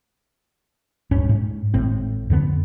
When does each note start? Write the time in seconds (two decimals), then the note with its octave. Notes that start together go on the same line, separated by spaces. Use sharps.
1.11 D1 G2 C#4
1.29 G#2
1.74 G#1 A2 C4
2.30 F2 D3 B3